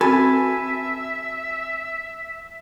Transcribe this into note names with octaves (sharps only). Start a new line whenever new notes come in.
C4 F#4 A4 B4 E5 G#5